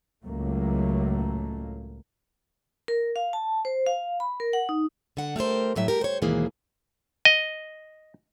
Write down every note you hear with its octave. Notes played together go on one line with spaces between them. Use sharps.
C#2 A2 F#3 A3 A#3
A#4
F5
A5
C5
F5
B5
A#4
F#5
D#4
D3 F#5
A3 G4 A#4 C5
F2 A2 F#3 E5
A3 G4 A#4
C5 C#5
D#2 G#2 B2 E3 A#3 G#4
D#5